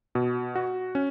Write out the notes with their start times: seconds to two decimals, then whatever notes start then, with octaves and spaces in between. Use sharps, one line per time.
0.15 B2
0.55 F#4
0.95 C#4